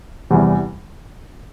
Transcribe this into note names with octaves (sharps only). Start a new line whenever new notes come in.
E2 C3 E3 G3